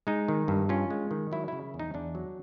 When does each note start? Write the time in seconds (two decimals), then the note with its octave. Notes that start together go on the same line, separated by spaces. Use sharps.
0.07 G#3 D#4
0.28 D#3
0.48 G2
0.69 C#4 F4
0.90 G#3
1.11 D#3
1.32 F#3 E4
1.48 C#3 E4
1.74 E2
1.79 D#4
1.94 E2 D4
2.15 F#3